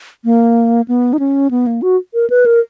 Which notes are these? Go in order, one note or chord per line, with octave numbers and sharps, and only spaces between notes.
A#3
B3
D#4
C#4
B3
A#3
F#4
A#4
B4
A#4